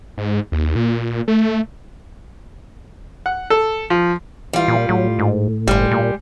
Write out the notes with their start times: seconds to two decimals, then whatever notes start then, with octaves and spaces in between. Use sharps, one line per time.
0.18 G#2
0.52 D#2
0.76 A#2
1.28 A3
3.26 F#5
3.50 A4
3.90 F3
4.53 E3 G3 F4
4.68 A#2
4.89 A2 F#3
5.19 G#2
5.68 G1 G3 G#3
5.92 A#2